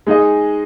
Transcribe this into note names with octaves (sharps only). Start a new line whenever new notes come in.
G#3 D#4 G#4 D#5